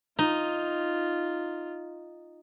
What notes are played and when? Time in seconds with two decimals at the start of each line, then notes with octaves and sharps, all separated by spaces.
0.19 D#4 F4